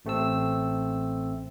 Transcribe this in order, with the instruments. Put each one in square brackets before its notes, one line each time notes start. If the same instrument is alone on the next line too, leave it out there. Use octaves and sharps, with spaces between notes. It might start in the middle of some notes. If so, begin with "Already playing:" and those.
[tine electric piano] A1 A3 C4 E6